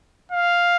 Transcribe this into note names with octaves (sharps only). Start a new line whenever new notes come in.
F5